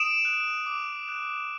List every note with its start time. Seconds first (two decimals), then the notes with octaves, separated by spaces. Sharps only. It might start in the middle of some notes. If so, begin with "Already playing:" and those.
Already playing: D#6 D7 E7
0.25 F#6
0.66 D6
1.09 F#6